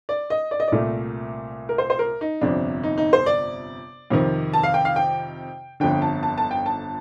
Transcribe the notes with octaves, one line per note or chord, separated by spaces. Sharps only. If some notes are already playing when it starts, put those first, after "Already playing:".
D5
D#5
D5
D#5
C2 A#2 A3 D5
A#4
C5
C5
A#4
D#4
G1 F2 C3 D4
D#4
D#4
C5
D5
F2 C3 D#3
A5
F5
G5
F5
G5
G1 F2 D3 G5
A5
A5
A5
G5
A5